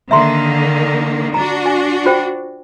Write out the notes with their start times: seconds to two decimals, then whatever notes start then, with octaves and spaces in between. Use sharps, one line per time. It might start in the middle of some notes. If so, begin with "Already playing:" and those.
0.11 D3 D#3 A#3 E5 A#5 C6
1.34 D4 F#4 A#5
1.66 G#5
2.06 F4 C5 G5